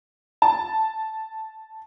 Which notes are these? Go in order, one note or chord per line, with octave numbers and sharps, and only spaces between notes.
A5